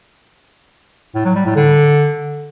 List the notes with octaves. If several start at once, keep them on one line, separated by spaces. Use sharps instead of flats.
A2
F#3
G3
A2
D3